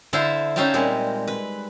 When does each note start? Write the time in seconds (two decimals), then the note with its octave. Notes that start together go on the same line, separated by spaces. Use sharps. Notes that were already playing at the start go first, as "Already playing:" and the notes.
0.13 D3 E4 C5 E5 F5 A5
0.56 C#4 D#4 E5 F5 G5 A5
0.74 A#2 G3 G#3 C4
1.28 B4